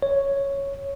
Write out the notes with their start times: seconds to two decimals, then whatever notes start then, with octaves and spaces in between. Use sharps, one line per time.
0.02 C#5